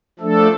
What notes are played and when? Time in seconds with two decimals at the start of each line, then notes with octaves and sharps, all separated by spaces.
0.19 F3 A3 D4 A4